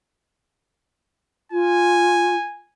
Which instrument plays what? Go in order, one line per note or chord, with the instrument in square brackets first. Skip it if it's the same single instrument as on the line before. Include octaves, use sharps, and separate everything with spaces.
[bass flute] F4 [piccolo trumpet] G#5